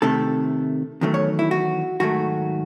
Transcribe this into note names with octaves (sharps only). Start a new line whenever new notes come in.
C3 D#3 A3 A4
E2 D#3 F#3 A3
C#5
E4
F#4
G#2 D#3 F#3 A3 F#4